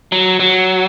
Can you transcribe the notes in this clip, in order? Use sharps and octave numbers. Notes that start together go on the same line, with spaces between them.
F#3
F#3